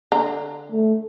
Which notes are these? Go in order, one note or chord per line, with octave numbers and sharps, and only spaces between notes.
D3 A#5
A3